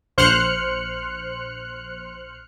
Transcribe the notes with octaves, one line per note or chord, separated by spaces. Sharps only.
A#1 C5 C6 F6 F#6 C#7